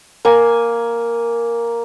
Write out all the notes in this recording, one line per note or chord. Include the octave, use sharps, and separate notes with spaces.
A#3 G#5